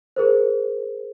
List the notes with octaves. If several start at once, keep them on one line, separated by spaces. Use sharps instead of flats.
G#4 A#4 C5